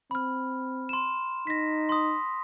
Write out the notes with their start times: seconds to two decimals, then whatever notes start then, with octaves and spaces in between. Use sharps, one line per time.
0.11 C4 B5 F6
0.89 C6 E7
1.47 D#4 A#6 B6
1.89 C6 D#6